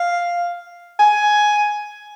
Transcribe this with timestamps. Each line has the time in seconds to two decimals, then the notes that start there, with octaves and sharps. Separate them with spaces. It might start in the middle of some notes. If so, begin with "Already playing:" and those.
Already playing: F5
0.99 G#5